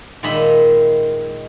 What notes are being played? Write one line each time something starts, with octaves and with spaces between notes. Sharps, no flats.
A#2 D#3 G#3 D#5 E5 B5